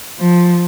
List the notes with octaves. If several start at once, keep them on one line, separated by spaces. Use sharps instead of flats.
F3